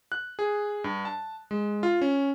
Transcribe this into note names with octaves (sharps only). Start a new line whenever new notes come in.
F#6
G#4
G2
A5
G#3
F4
C#4